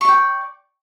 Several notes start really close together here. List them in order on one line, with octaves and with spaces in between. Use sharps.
C#6 D5 G5